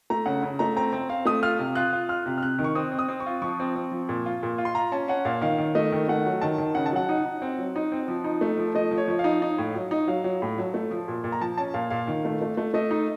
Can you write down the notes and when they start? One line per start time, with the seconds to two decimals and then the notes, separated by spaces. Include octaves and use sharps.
0.10 A3 A#5
0.26 C#3 F#5
0.43 C#3
0.59 A3 A#5
0.76 C4 A#5
0.93 C4
1.09 C4 F5
1.25 A3 D#6
1.43 F4 F6
1.59 C3
1.75 F4 F#6
1.93 F4
2.09 F4 F6
2.26 C3
2.38 F6
2.42 C3 F#6
2.59 D#3
2.64 C#6
2.75 C4 D#6
2.92 C4
2.99 D#6
3.08 C4
3.20 C#6
3.26 F4
3.42 F3 C#6
3.60 C4
3.76 C4
3.92 F3
4.09 A#2
4.26 F4
4.43 A#2
4.58 F4
4.65 C6
4.75 F4 A#5
4.92 C#4 A5
5.08 C#4 F#5
5.25 A#2 F5
5.42 D#3 F5
5.58 D#3
5.75 A3 D#5
5.92 D#3
6.08 A3 F#5
6.26 F#3
6.41 D#3 A5
6.58 D#3
6.75 C#3 F#5
6.86 A5
6.92 F#3 F#5
7.09 D#4
7.25 D#4
7.42 C4
7.58 F#3
7.76 D#4
7.92 C4
8.08 F3
8.24 D#4
8.41 A3
8.58 F3
8.75 A3 D#5
8.91 F3
8.97 C#5
9.08 F3
9.19 F5
9.24 D#4
9.42 D#4
9.58 A2
9.75 F#3
9.91 D#4
10.08 F#3 F5
10.24 F#3
10.42 A2
10.58 F#3
10.74 A3
10.91 F3
11.08 A#2
11.24 A#2
11.32 A#5
11.41 F3 A5
11.58 C#4 A5
11.74 A#2 F5
11.90 A#2 F5
12.08 D#3
12.25 A3
12.42 A3
12.57 A3
12.74 A3 D#5
12.91 D#4